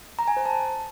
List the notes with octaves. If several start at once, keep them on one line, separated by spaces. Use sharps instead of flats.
A#5
G#5
C5
A5